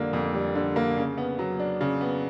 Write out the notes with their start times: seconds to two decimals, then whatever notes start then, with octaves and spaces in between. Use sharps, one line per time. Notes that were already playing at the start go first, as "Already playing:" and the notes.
Already playing: F2 D3 G3 A#3
0.13 F2
0.34 G3
0.55 D3
0.76 A#3
0.97 C#3
1.17 B3
1.39 F#3
1.59 D4
1.81 C#3
2.01 B3